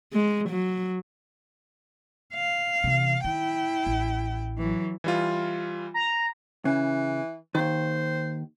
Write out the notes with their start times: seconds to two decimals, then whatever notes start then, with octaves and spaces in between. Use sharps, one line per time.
0.13 G#3
0.49 F#3
2.34 F5
2.84 C3 E3
3.24 D#3 E4 G5
3.86 A1
4.58 E3 F#3
5.04 E3 G3 F4
5.94 A#5
6.65 C#3 E3
7.55 D#2 D#3 C5